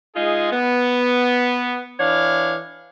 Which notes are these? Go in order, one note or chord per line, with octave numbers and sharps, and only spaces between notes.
G#3 D#4 F4 G#4
B3
E3 D4 C#5 F5